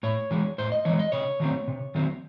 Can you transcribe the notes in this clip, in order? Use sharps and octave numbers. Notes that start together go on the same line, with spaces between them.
A2 C#5
E3 G#3
A2 C5
D#5
E3 G#3 C#5
D#5
C3 C#5
D#3 F#3 A3 C4
C3
D#3 F#3 A3 C4